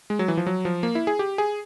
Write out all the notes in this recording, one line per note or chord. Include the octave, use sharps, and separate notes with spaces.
G#3
F#3
E3
F3
F#3
F3
A#3
E4
G#4
G4
G#4